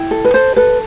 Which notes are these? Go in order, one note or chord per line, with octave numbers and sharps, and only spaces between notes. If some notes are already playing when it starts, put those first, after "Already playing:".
Already playing: E4 G5
A4
B4
A4 C5
A4 B4